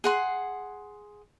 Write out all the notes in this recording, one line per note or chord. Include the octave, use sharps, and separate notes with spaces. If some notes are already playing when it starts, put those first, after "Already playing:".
G#4 F#5 C6